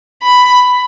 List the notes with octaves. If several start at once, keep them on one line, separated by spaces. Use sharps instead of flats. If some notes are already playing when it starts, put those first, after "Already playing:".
B5